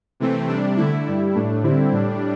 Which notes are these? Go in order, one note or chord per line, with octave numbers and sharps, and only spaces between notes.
C3 E3 A3 C4
C3 G3 D4
D3 A3 E4
G2 G3 E4
A2 A3 D4
D3 G3 C4 E4
A2 G3 D4